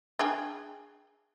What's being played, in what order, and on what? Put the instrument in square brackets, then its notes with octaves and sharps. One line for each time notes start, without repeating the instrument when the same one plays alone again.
[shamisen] D4 G#4 G5